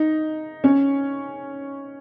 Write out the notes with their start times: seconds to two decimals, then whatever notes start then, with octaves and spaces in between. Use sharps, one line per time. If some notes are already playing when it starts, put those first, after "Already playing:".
Already playing: D#4
0.64 C#4